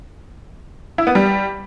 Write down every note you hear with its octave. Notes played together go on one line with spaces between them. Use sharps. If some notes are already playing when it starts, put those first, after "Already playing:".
E4
B3
G3